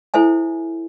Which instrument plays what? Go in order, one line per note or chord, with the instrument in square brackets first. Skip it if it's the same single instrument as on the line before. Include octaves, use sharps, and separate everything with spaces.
[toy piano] E4 A4 C5 E5 G#5